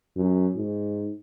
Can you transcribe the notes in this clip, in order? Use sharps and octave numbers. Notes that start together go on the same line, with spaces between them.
F#2
G#2